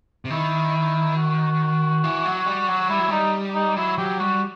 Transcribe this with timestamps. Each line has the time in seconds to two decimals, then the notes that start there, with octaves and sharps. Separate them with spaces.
0.25 C3
0.30 D#3 E4
1.16 F#4
2.04 E3
2.25 F#3
2.46 G3
2.68 F#3
2.89 G3 E4
2.99 F#3
3.08 G3 D#4
3.54 D#4
3.76 F#3 E4
3.98 F#3 G4
4.19 G3 F#4